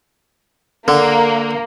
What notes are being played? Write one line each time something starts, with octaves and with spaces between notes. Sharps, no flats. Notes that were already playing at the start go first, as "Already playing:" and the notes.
D3 A#3